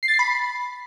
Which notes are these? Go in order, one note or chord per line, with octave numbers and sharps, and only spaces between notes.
C7
A6
C7
B5